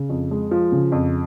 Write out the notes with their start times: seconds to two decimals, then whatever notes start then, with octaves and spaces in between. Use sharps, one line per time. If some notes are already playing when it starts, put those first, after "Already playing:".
Already playing: C#3
0.09 F2
0.31 G#3
0.51 F3
0.72 C#3
0.92 F2